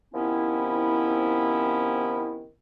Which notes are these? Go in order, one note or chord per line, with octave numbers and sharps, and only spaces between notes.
C3 D#3 F3 B3 C#4 E4